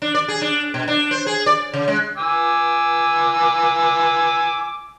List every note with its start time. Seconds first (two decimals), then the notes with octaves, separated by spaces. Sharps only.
0.02 D4
0.14 D5
0.28 G#4
0.41 D4
0.74 B2
0.88 D4
1.11 C5
1.26 G#4
1.46 D5
1.74 C#3
1.88 G#3
2.18 G#5 D6 E6